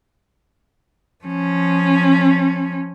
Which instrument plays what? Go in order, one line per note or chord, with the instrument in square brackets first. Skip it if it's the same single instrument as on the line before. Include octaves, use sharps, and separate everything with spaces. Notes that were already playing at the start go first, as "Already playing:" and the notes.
[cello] F3 C#4